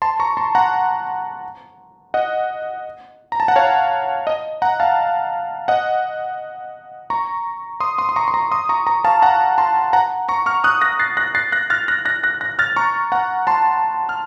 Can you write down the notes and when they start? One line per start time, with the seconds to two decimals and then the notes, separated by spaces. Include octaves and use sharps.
0.02 A5 C6
0.20 A#5 C#6
0.37 A5 C6
0.55 F#5 A#5
2.14 D#5 F#5
3.32 A#5
3.40 A5
3.48 F#5
3.56 C#5 F5
4.27 D#5
4.62 F#5 A#5
4.80 F5 A5
5.68 D#5 F#5
7.10 A#5 C#6
7.80 C6 D#6
7.98 C6 D#6
8.09 C6
8.16 A#5 C#6
8.28 C6
8.34 A#5 C#6
8.51 C6 D#6
8.69 A#5 C#6
8.87 A#5 C#6
9.05 F5 A5
9.22 F#5 A#5
9.58 A5 C6
9.93 F#5 A#5
10.28 A#5 C#6
10.46 C#6 F6
10.64 D#6 F#6
10.81 F#6 A#6
10.99 A6 C7
11.17 F#6 A#6
11.35 A6 C7
11.52 F#6 A#6
11.70 F6 A6
11.88 F#6 A#6
12.05 F#6 A#6
12.24 F#6 A#6
12.41 F#6 A#6
12.59 F6 A6
12.76 A#5 C#6
13.12 F#5 A#5
13.47 A5 C6
14.09 F6